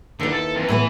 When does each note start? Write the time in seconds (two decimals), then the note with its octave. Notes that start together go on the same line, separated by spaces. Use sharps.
0.20 D#2 D3 E4 B4
0.33 A4
0.56 F2
0.68 A2 G#3 B3 B4 E5